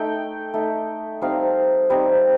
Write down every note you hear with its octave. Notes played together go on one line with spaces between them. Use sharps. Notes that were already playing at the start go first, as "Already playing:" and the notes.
Already playing: A3 D#4 G5
A3 D#4
G3 C4 D#4 F5
G3 C4 D#4